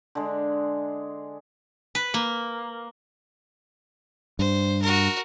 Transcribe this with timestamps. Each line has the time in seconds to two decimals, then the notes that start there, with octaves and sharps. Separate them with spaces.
0.15 D3 G#3
1.95 B4
2.14 A#3
4.39 G2 C5
4.82 F#4 A#4